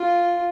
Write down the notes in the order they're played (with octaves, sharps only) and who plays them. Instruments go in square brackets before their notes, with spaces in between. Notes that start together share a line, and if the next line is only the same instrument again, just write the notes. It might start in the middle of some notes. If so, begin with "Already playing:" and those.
Already playing: [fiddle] F4